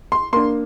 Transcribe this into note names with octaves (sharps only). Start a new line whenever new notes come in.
C6
A#3 D4 C6